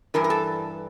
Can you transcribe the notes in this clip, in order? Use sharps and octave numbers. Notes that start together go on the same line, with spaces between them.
G2 E3 A#4
A#4
A4